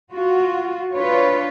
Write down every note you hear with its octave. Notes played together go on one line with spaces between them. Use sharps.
F4 F#4
D4 F4 B4 C#5